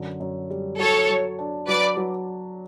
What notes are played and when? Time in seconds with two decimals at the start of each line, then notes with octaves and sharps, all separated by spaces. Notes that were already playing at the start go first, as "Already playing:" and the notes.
Already playing: F#2 D3
0.20 F#2
0.50 G3
0.79 F#3 A4 C#5
1.09 F#3
1.39 D4
1.67 F#3 B4 D5
1.97 F#3